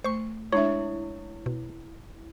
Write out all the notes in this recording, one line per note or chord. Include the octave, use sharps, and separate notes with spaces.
A3 C5 C#6
G#3 D4 E4 C#5 E5
B2